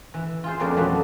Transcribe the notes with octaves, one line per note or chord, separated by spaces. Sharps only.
E3
F4 G#4 C5
F2 G#3 A#3 C#4 D4 D5
B2 E3 F#3 A3 A#3